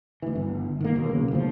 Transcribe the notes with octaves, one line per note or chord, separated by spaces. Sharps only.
D2 E3
G1
D#3 A#3
D#2 B2
B1 C#3
F#1 D2 F3